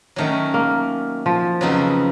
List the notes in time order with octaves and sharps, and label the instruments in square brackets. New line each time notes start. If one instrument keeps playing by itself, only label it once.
[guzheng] D#3 F#3 A3 C#4
[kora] A#3
F3
[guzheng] F2 C#3 F#3 B3 D#4